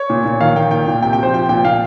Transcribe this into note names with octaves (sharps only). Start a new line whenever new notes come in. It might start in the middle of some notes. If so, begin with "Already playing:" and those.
Already playing: C#5
A#2
A#2
D#3 F5
D#3 G5
A#2 G5
A#2
C3 G5
G5
F3 C5
F3 G5
A#2 G5
A#2 F5